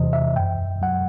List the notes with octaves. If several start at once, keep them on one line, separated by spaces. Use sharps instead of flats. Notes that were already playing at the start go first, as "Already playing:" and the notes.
Already playing: E2 C3 E3 C5 D#5
E5
F#2 G5
F#3 F#5